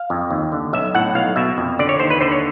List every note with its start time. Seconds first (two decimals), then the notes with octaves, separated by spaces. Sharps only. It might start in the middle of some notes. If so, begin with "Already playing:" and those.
Already playing: F5
0.10 F2
0.31 D#2
0.52 D3
0.73 B1 E5
0.94 A2 F#5
1.15 B1 F5
1.36 B2 E5
1.58 F2
1.79 D3 D5
1.89 C#5
1.99 D#2 C5
2.10 B4
2.20 D3 C5
2.32 C#5